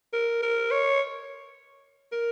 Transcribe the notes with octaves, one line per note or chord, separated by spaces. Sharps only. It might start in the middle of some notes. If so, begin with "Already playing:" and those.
A#4
A#4
C#5
A#4